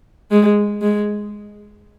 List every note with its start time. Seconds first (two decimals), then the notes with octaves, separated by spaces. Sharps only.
0.31 G#3
0.82 G#3